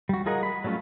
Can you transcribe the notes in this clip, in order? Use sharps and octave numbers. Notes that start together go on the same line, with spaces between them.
G3 F#4
F4 G#4 A#4 D#5 F#5
B5
F#3 G3 A3 C#4 F4